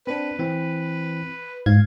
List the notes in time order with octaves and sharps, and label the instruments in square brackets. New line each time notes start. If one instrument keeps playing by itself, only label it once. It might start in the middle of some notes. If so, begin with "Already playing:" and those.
[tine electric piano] C4 D4 [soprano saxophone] B4
[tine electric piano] E3 C4
[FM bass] G#2 [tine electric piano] F5 G#6